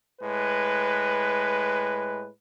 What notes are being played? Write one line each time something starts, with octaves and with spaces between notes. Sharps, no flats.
A2 G#3 B4